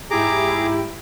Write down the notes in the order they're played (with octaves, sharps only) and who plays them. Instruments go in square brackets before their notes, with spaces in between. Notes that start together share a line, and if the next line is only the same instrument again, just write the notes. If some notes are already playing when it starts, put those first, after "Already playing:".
[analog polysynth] G#2 E4 G4 [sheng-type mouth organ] G#4 A#5 D6